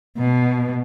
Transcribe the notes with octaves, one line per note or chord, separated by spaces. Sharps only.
B2